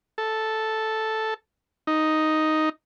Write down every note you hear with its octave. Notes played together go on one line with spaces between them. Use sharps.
A4
D#4